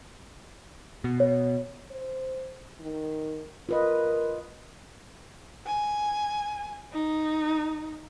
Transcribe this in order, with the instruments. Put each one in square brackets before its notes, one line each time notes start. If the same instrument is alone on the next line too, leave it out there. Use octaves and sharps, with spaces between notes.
[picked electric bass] B2
[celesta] C#5
[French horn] C5
D#3
[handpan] F4 B4 D#5 [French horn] A#4
[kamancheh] G#5
D#4